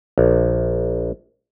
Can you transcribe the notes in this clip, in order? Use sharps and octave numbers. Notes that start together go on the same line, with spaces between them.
A#1